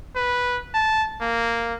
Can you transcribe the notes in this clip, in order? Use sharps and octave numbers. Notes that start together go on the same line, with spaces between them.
B4
A5
A#3